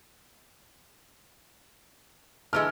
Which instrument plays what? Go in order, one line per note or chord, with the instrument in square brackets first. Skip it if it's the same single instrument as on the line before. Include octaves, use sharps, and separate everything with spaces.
[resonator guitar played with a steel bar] D3 E3 G#3 [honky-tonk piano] F6